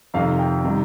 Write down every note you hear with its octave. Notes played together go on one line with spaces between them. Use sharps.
F2 C3 D#3 F5
G5
C3 D#3 G3